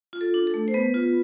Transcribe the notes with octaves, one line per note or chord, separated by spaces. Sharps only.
F4
A4
D4
A4
A3
C5
B3 B4
F4